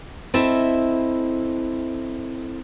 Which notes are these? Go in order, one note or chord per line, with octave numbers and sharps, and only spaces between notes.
C4 E4 A4 D#5 E5